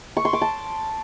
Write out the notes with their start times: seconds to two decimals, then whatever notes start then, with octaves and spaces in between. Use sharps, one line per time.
0.17 C#6
0.25 C6
0.33 D6
0.41 A5